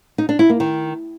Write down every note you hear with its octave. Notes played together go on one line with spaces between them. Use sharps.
D#4
D4
E4
A#3
D#3